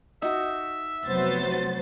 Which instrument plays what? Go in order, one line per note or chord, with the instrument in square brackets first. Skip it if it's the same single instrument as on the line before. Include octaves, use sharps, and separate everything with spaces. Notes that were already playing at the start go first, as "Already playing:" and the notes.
[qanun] D#4 F#4 [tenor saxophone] E5
[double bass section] F1 F#3 [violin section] B3 C5 A6